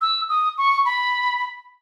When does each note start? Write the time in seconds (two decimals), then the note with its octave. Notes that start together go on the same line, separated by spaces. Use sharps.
0.01 E6
0.29 D#6
0.58 C#6
0.85 B5